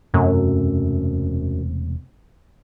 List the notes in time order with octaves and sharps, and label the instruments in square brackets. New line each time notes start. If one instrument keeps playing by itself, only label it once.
[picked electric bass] E1 C3 A3 [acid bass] F#2